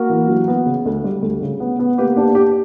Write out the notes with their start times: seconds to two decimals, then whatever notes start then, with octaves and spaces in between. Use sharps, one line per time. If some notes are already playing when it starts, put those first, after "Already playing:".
Already playing: A#3 F#4 A#4
0.10 E3
0.28 F#3
0.48 B3
0.66 C#3
0.86 D2
1.04 G3
1.22 D2
1.41 C#3
1.60 B3
1.79 B3
1.98 A#3 G4 B4
2.16 D4 G4
2.35 D4 G4